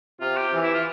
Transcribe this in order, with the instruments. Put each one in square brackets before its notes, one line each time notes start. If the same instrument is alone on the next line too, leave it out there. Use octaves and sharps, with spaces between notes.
[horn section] C3 [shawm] F4
[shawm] G4
[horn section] E3
[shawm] E4
F4